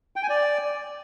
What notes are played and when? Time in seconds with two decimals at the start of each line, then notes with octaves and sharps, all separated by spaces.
0.16 G5
0.23 G#5
0.29 D5